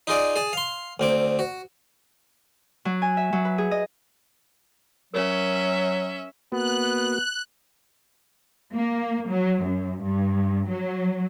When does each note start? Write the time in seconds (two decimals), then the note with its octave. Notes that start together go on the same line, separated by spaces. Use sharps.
0.07 D#4 F4 G#4 D5
0.36 G#4 A5
0.53 F5 C6
1.00 D2 C4 D6
1.39 F#4
2.85 F#3
3.02 G#5
3.17 E5
3.33 F#3
3.45 B4
3.58 G#4
3.71 D#5
5.14 F#3 C#4 A#4 C#5 E5
6.52 A#3 B3 F#4 F#6
8.73 A#3
9.29 F#3
9.63 F#2
10.04 G2
10.69 F#3